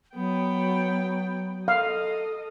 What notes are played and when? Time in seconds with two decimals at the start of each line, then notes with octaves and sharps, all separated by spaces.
0.15 F#3 B3 G5
1.68 A4 D#5 F5